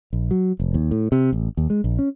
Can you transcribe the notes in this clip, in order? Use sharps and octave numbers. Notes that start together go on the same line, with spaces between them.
A#1
F#3
F1
D#2
A2
C3
A1
D#2
G#3
A#1
C#4